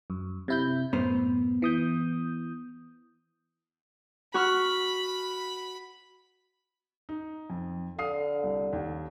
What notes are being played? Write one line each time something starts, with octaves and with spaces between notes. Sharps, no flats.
F#2
C3 E4 G6
F#2 A2 B3 A#4 C5
E3 D#6 G6
F#4 B5 C#6 F6
D#4
F2
D3 F5 D#6 C7
C2
D#2